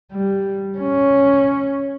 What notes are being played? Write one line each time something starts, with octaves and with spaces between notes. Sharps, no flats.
G3
C#4